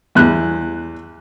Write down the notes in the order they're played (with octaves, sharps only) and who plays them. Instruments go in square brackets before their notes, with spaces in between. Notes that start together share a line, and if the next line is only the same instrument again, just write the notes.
[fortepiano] E2 F#6